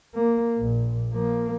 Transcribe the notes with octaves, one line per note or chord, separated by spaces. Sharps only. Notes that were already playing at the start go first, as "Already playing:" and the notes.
A#3
A#1 A#2
F3 A#3